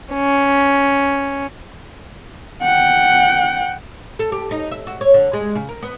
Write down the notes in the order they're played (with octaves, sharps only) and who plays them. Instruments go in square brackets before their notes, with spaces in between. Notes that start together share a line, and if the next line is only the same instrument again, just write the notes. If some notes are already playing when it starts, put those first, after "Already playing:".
[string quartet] C#4
[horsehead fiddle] F#5 G5
[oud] A4
G4
D#4
E5
F#4
C#5
D3
G#3
C#3
A#4
B3